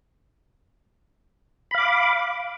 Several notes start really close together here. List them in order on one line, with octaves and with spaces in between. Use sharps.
B5 F5 D6